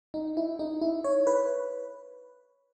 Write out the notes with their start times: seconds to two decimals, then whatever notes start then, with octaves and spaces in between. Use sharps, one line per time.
0.14 D#4
0.37 E4
0.59 D#4
0.81 E4
1.04 C#5
1.27 B4